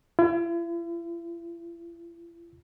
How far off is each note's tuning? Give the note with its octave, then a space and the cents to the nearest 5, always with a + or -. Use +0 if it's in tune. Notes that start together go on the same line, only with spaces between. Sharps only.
E4 +45